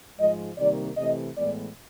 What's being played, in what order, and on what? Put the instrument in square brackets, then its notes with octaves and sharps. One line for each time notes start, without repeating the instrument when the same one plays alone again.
[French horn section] G#2 F3 G#3 D#5
C3 D#3 G3 A#3 D5
C3 E3 A3 D#5
A2 E3 G#3 B3 D5